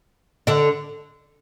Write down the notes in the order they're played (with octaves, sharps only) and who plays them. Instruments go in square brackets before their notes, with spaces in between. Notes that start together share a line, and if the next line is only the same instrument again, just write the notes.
[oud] D3 D4